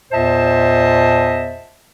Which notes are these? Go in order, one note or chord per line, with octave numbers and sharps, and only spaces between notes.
E2 A#2 C5 D#5 E5 A5